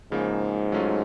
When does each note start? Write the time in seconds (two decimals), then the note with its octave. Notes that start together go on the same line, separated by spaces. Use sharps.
0.12 G#2 C#3 F3 A#3
0.72 F#3 A3 C#4 F4